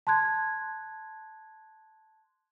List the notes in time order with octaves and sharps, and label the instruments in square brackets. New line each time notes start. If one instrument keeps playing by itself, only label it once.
[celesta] A5 C6 F#6 G#6